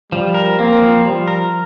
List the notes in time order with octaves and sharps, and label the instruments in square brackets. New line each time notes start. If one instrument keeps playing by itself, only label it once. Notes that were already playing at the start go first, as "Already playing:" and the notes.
[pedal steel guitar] F3 [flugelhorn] G3
[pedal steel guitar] A#4
[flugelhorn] A#3 [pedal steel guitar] C4
[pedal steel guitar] F3
[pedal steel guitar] F3 [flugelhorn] G3
[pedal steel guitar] A#4